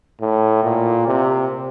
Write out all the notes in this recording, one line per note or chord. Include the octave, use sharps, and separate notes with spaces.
A2
A#2
C3